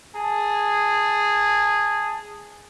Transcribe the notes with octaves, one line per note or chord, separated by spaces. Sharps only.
G#4 A5